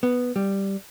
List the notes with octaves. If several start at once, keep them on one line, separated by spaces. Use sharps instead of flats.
B3
G3